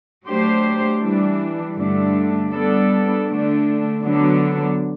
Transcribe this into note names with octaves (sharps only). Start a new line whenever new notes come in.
F#3 A3 D4 G4 C5
E3 G3 D4
G2 D3 A3 D4
G3 B3 D4 A4
D3 A3 D4
D3 F#3 B3 D4